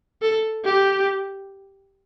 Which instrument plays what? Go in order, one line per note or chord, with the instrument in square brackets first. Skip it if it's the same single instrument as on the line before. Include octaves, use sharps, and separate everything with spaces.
[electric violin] A4
G4